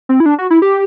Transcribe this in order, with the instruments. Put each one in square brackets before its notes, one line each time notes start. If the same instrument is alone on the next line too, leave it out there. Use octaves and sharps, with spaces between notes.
[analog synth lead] C4
E4
D4
F#4
E4
G4